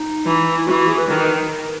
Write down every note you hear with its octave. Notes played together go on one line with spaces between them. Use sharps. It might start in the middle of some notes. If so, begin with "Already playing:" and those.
Already playing: D#4
E3
E4
E3 F#4
F#4
G#4
B4
D#3
A#4